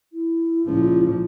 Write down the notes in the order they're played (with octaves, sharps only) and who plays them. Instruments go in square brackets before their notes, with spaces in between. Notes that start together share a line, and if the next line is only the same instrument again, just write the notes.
[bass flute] E4
[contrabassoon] C#2 [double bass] A#2 F3